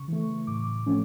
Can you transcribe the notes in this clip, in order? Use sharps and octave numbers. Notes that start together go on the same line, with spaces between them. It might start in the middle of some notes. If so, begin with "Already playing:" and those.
Already playing: C#3 C#6
E3 A3
A2 D6
F3 A3 C#4